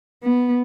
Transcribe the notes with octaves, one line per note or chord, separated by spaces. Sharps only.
B3